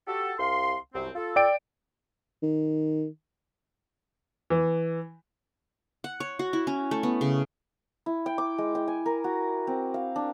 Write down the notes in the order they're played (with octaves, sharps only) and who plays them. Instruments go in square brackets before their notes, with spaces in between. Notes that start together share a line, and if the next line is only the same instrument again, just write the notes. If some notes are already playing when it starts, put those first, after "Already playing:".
[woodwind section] F#4 G4 A4
C2 F5 C6
C2 F#2 C4
F4 A4
[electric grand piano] D5 G5 D7
[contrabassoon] D#3
[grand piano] E3
[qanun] F#5
C#5
F#4
E4
C#4
A3
B3
C#3
[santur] E4
G5
D6
G#3
G5
G#5
A#4
F#4
C4
F5
D4